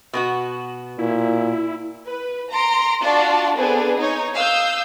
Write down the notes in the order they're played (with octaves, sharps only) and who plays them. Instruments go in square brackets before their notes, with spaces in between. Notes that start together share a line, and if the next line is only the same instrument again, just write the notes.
[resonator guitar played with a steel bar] B2 B3 F#4
[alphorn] A#2 [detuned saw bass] E4
[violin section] B4
A#5 C6 D7
D4 F4 F#4 D5 A5
B3 C4 D4 G#4 A4 B4
D#4 C#5
F5 D#6 E6 G6